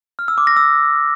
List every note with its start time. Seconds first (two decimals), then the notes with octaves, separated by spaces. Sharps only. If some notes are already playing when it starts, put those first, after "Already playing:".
0.19 F6
0.28 E6
0.38 D6
0.47 A#6
0.57 E6